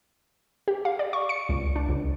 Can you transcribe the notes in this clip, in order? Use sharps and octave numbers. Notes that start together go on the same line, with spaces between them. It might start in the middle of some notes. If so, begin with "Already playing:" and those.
G4
F5
D5
C#6
C#7
C#2
D4
C#2